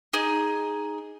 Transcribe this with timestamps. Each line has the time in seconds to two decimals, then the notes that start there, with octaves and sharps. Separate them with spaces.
0.13 D#4 G#4